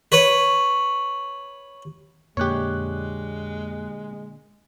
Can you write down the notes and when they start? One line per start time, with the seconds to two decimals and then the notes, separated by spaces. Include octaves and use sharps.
0.12 B4 C#5
2.37 F2 A#2 D3 G#3 A#3 G4 C#5 F#6